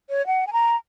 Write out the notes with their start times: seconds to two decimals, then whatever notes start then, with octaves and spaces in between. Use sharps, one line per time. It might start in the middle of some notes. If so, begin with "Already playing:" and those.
0.10 C#5
0.27 F#5
0.47 G#5
0.53 A#5